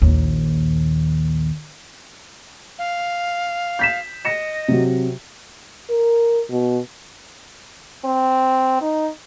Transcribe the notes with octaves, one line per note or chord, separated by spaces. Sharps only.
A#1 D#2
F5
G6 B6 E7
D#5 A#6 C#7 E7
C3 F#3
A#4
B2
C4
D#4